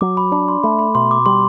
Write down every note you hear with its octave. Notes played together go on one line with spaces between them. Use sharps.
F#3 D6
B5
D4 B5
C6
A3 B5
B5
B2 C6
D6
G3 C6